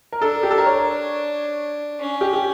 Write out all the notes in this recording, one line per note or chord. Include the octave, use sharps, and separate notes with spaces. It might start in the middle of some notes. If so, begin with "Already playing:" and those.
A#4
D4 A4
G4
A4
A#4
C#5
C#4
G4
G4